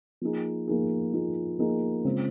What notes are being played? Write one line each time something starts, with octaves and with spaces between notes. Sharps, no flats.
F3 A#3 D#4 G#4
F3 A#3 D#4 G#4
F3 A#3 D#4 G#4
F3 A#3 D#4 G#4
C#3 G#3 C4 F4